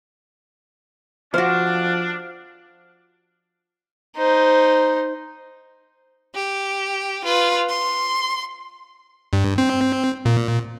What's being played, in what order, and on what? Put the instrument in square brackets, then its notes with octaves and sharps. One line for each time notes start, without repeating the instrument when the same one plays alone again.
[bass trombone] F3 [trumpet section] D4 [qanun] F#4 C5 [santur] F5
[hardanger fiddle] D#4 C5
[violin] G4
F4 B4
C6
[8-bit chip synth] G2
C4
A#2